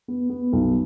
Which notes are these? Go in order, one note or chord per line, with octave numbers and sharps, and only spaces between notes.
B3
B3
B1